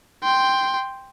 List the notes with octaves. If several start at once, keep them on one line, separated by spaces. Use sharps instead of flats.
G5 C6